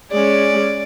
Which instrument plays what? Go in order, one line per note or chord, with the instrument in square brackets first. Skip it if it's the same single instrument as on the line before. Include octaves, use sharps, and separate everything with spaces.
[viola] G#3 C#4 [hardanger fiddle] D5